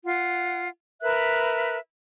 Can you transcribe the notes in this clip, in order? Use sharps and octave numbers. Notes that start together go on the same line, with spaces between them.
F4 F#5
A#4 B4 E5 F#6